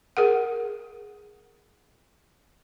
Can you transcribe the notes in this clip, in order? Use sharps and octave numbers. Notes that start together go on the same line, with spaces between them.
G#4 A#4 F#5